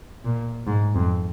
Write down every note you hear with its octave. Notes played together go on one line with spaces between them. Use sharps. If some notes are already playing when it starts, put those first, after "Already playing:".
A#2
G#2
F2